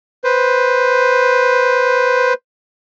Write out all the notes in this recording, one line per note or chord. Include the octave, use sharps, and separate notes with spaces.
B4 C5